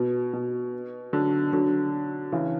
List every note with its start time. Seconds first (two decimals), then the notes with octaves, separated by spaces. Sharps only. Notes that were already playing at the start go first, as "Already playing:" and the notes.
Already playing: B2
0.33 B2
1.13 D3 F#3
1.53 D3 F#3
2.32 C#3 E3